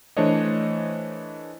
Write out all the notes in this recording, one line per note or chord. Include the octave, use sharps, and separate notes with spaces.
E3 A3 D4 C5 C#5 D#5